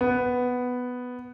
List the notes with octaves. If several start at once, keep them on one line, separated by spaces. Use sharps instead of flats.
B3